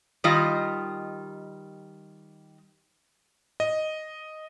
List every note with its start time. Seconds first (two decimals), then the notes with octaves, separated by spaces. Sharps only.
0.24 D#3 G3 F4 D#5
3.60 D#5